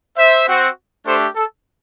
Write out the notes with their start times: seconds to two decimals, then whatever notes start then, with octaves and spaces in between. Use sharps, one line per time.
0.17 C5 E5
0.47 C4 F#4
1.06 A3 D4 G4 A4 C5
1.35 A4